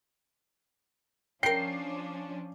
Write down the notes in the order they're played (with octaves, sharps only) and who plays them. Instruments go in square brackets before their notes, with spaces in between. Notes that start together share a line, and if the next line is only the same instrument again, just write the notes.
[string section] F3 C#4 D4 [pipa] A#4 G5 [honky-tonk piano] C7